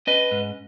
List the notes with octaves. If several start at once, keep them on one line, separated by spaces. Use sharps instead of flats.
C#4 B4 D#5
G#2